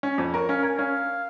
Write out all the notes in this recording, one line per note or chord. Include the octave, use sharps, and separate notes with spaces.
C#4
F2
A#4 C#5
C#4 F5
A#4 G#5
C#4 F5